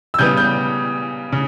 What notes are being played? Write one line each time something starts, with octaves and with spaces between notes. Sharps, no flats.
E6
C#3 G3 B3 G6
G6
C#3